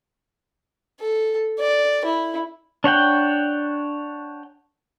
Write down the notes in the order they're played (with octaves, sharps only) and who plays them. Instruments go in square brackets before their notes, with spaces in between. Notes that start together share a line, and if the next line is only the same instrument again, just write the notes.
[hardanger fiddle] A4
D5
E4
[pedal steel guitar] D4 C#5 F#5 G5